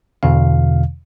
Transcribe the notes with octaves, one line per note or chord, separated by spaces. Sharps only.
E2 B2 D3 F5